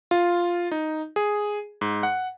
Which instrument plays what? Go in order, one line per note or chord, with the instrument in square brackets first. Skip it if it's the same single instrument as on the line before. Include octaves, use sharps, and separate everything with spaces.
[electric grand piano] F4
D#4
G#4
G#2
F#5